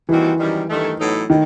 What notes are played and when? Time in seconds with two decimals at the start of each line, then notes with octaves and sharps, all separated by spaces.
0.09 D#2 D#3 E3 G3 C4 F#4
0.39 F#2 D#3 G3
0.69 G2 D#3 A3
0.99 A2 F#3 B3 D#4 A4
1.30 A2 D#3